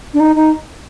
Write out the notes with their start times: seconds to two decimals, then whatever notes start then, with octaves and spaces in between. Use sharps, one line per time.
0.14 D4
0.20 D#4
0.36 D#4